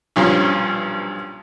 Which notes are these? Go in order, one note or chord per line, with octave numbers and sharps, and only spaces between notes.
B1 G2 A#2 F3 C#4